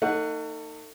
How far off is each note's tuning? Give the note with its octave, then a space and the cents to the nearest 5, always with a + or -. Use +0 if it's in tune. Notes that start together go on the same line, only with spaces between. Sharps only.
A3 +40 D#4 +0 F#5 +0